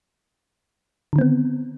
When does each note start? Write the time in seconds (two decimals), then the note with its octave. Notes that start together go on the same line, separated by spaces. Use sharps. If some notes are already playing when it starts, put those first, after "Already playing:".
1.13 D3
1.16 D#3
1.19 C4
1.21 B3